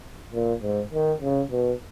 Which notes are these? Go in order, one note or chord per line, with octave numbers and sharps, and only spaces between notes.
A#2
G#2
D#3
C#3
B2